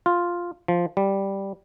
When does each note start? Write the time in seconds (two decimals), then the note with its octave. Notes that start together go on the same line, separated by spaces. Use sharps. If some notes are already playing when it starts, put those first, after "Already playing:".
0.06 F4
0.68 F3
0.97 G3